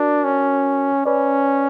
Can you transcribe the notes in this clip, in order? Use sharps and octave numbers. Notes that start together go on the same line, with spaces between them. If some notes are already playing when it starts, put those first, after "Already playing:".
Already playing: D4 F#4 A#4
C#4
C#4 B4 D5